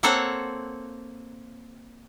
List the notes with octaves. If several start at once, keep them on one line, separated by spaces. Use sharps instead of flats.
A#3 C4 A4 C5 C#5 F#5